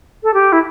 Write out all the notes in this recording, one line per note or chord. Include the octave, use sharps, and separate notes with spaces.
A4
G4
E4